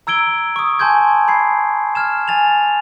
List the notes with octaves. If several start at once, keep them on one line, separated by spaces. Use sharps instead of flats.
A#5 E6 G#6 D7 G7
C#6 D#6
G#5 A5 C6 G6 G#6
B5 G#6 C7
F6 G#6 E7
G#5 A6 F7